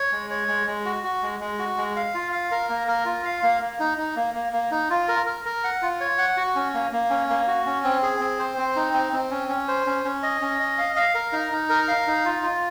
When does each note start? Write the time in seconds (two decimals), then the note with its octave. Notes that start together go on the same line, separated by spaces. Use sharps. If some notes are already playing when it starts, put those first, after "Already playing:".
Already playing: C#5
0.12 G#3
0.30 C#5
0.48 G#3
0.67 G#3
0.85 F#4
1.04 F#4
1.23 G#3
1.40 G#3
1.59 F#4
1.77 G#3
1.96 F5
2.14 F4
2.32 F5
2.51 A#4
2.69 A#3
2.88 A#4
3.06 F4
3.25 F5
3.43 A#3
3.62 A#3
3.79 D#4
3.98 D#4
4.16 A#3
4.34 A#3
4.53 A#3
4.71 D#4
4.90 F4
5.08 A#4
5.26 A#4
5.45 A#4
5.64 F#5
5.82 F4
6.00 C#5
6.18 F#5
6.37 F#4
6.55 C#4
6.74 A#3
6.92 A#3
7.10 C#4
7.29 A#3
7.47 F#4
7.66 C#4
7.84 C4
8.03 G#4
8.20 C4
8.39 C5
8.58 C4
8.76 D#4
8.94 C4
9.13 C4
9.31 C#4
9.49 C#4
9.68 C5
9.86 C#4
10.05 C#4
10.23 D#5
10.41 C#4
10.59 D#5
10.78 F5
10.96 F5
11.14 A#4
11.32 D#4
11.52 D#4
11.69 A#4
11.88 F5
12.07 D#4
12.25 F4
12.43 F4